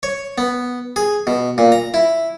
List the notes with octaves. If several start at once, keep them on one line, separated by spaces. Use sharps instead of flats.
C#5
B3
G#4
B2
A#2
A#5
E4